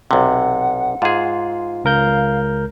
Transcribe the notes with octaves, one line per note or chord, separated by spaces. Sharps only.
B1 C3 F#5
G#2 F4 G#4
C#2 A#4 F5 G6